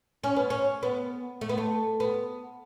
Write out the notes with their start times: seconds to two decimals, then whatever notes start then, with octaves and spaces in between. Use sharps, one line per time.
0.24 C#4
0.36 B3
0.50 C#4
0.83 B3
1.41 A3
1.49 B3
1.58 A3
2.00 B3